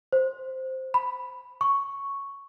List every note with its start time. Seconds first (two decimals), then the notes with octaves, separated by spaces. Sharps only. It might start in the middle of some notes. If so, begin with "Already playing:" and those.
0.13 C5
0.94 B5
1.61 C#6